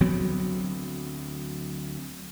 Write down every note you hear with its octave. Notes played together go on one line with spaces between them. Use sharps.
D2 F#3 B3 C4